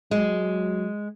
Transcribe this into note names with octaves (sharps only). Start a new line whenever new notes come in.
F#3 G#3